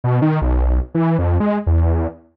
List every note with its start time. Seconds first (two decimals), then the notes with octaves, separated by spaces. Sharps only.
0.04 B2
0.22 D#3
0.42 B1
0.95 E3
1.19 F2
1.40 G#3
1.67 E2